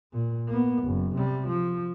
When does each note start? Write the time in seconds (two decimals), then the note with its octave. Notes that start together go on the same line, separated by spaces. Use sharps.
0.13 A#2
0.48 A#3 B3
0.83 F#1
1.16 C3 G3
1.47 F3